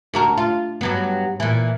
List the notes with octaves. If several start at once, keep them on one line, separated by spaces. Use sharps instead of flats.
D2 F#4 A#4
F4
G2 F#3 B3
A#2 E3